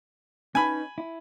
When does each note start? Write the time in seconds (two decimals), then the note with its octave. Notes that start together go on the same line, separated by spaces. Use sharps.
0.55 C#4 D#4 B4 G#5 B5
0.98 E4